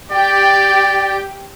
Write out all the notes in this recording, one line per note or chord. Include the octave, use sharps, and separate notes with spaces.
G4 D5 G5